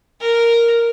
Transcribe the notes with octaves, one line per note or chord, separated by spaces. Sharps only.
A#4